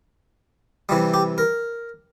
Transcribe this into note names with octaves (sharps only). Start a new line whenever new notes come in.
C3 E3 G3
G4
A#4